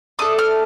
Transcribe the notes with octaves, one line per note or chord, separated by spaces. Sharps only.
A3 D4 A4 D#6
F6